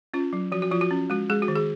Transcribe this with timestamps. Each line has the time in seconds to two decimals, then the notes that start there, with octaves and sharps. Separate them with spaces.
0.14 C#4 F4
0.33 F#3
0.52 F3 F#4
0.62 F#4
0.71 F3 F4
0.81 F#4
0.91 C#4
1.10 G#3 F#4
1.29 G#3 G#4
1.42 F#4
1.48 D#3
1.56 G#4